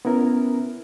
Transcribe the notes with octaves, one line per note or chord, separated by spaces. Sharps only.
B3 C#4 E4 A#4